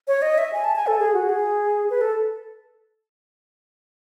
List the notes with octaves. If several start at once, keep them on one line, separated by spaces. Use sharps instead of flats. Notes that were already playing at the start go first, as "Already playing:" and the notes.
C#5
D#5
E5
G#5
A5
G#5
A4
G#4
F#4
G#4
B4
A4